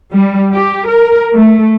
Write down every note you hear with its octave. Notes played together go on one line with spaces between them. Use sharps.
G3
G4
A#4
A3